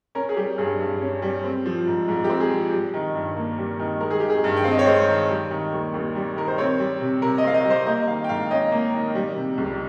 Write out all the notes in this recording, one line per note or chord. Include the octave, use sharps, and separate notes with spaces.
C#4 A#4
G#4
G3 G4
G2 G#4
G2
C#4
G3
C4
F3
G#2
G#2
G4
C4
G#4
F3
G3
D#3
G2
A#3
G3
D#3
G#3 A#4
G#4
D#3 G4
G#4
G2
G5
C4 F5
D#5
C#5
G#3 C5
D#3
G3
D#3
D#2
D#2
G3
D#3 A#4
C5
C4 C#5
G3
C3
C3 A#4
D#5
C4 F5
D#5
G3
C5
A#3 D#5
D#3 F5
G5
G#2 F5
C#4 D#5
A#3
D#3
G3
C3
C#2